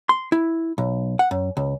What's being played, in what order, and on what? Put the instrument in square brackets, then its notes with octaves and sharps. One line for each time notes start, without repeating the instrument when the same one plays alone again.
[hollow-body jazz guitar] C6
E4
B1
F#5
F#2
C#2